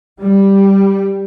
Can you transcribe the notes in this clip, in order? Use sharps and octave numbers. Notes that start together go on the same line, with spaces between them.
G3